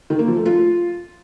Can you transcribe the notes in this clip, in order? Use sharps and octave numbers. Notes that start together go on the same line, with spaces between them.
D#3
A#3
F3
A3
F4